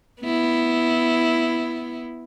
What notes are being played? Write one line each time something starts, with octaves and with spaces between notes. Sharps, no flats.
B3 E4